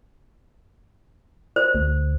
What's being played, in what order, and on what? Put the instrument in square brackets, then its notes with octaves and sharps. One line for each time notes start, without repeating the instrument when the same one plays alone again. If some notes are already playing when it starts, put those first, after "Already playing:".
[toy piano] C5
[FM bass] D2